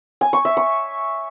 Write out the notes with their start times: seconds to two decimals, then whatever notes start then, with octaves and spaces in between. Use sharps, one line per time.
0.21 G#5
0.33 C#6
0.45 E5
0.57 C#6